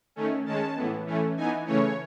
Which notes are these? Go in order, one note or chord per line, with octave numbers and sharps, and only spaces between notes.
D#3 A3 C#4
D#3 G#3 C#4 A5
A2 E3 B3
E3 A3 C#4
E3 B3 D#4 G#5
C#3 E3 A3 C#4 C#5